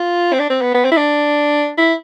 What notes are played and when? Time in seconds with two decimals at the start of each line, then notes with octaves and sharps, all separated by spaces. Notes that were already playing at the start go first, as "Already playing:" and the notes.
Already playing: F4
0.33 C4
0.39 D4
0.50 C4
0.61 B3
0.74 B3
0.85 C4
0.91 E4
0.97 D4
1.78 E4